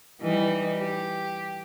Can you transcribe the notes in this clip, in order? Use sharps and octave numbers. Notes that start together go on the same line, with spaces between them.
E3 G3 D#4
G4